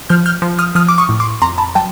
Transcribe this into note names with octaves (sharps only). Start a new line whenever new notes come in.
F3 F6 G6
F6 G6
F3
D#6 F6
F3 D#6 F6
D6
C#6 D#6
A2
C6 D6
F2 A#5 C6
A5 B5
F#3 G5 A5